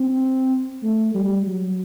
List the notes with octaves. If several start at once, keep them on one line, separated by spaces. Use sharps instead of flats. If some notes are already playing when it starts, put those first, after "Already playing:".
Already playing: C4
A3
G3
F#3